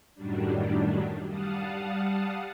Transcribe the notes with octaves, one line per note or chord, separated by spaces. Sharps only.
F#2 A2 D#3 F#3 G3 D4
G3 F5 F#5 A5 D#6